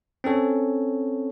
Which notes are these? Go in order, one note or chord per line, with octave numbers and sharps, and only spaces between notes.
C4 C#4 A4 C#5